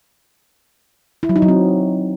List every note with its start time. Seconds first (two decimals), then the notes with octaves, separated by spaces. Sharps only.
1.23 E4
1.29 F#3
1.36 D#4
1.42 F#3
1.48 C4